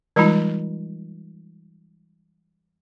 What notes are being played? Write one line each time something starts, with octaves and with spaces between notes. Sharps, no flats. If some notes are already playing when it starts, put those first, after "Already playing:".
E3 G3 G#3 D#4 F4 A5